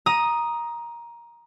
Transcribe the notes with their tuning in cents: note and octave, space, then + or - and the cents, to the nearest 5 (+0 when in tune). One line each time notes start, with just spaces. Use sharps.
A#5 +15 D#6 +0